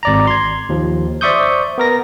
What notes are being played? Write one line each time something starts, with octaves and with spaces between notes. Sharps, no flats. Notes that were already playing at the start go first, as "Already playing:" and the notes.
G#1 D5 A#5
C6 G#6
D#2 F3
C5 D5 E5 C#6 D#6 G6
B3 A#4 A#6